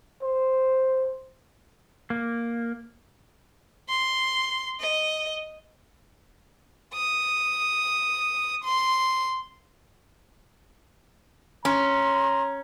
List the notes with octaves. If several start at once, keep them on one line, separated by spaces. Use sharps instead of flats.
C5
A#3
C6
D#5
D#6
C6
C#4 A#5 C6